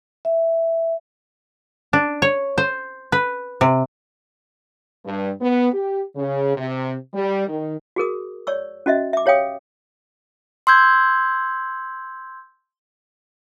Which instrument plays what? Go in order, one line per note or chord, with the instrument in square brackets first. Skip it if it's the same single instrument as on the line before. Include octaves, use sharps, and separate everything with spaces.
[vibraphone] E5
[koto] D4
C#5
C5
B4
C3
[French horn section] G2
B3
G4
C#3
C3
G3
D#3
[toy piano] F#4 G#4 A#4 D#6
C#5 D5 C#6 E6
C#4 F#4 D#5 E5
E5 D6
G4 C#5 F5 G5 D#6
[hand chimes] C6 E6 G6 G#6